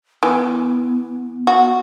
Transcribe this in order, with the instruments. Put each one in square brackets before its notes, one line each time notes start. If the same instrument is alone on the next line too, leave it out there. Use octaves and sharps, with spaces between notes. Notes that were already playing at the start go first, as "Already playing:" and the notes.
[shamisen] E3 [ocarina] B3
[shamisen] F#4